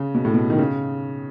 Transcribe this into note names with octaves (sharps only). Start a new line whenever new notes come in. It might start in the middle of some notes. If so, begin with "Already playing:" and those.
Already playing: C#3
B2
A2
B2
D#3
C#3